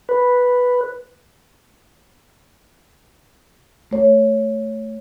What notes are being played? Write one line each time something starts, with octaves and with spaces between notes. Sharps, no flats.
B4
A3 C#5